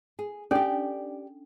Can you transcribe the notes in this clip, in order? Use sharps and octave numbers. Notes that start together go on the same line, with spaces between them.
G#4
C#4 D4 G4 A4 D5